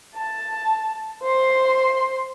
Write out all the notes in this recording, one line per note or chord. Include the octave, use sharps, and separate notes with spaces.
A5
C5 C6